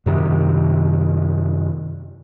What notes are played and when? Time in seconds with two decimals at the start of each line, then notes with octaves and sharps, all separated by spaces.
0.06 F#2 C3 D#3